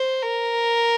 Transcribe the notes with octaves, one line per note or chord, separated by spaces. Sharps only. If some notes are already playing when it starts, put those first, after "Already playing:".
Already playing: C5
A#4